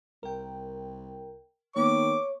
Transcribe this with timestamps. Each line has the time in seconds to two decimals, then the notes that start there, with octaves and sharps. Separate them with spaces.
0.23 C2 A#4 G5
1.76 D#3 A#3 B3 C#5 D6